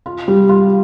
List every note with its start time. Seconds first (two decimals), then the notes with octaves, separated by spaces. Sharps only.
0.06 F4
0.28 G3
0.49 F4